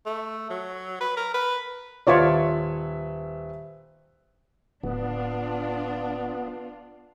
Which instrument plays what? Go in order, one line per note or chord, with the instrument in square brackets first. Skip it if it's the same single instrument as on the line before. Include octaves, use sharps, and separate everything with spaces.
[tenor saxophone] A3
F#3
B4
A#4
B4
[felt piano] D#1 B4 E5 [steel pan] F4 C#5 D5
[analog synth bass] D1 [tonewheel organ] B3 [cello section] D4 F4